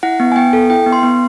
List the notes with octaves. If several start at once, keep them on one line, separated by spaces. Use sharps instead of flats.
E4 F#5
B3
G#5
B3 G5
A4
E4 G5
B3
C6
B3